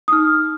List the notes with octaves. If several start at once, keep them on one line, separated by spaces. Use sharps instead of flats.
D#6
D#4 F6